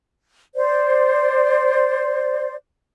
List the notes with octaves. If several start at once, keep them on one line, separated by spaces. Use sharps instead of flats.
C5 D5